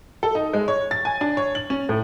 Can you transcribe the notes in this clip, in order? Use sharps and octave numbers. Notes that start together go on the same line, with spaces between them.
A4
D#4
G#3
C#5
A6
G#5
D4
C#5
F#7
C#4
A2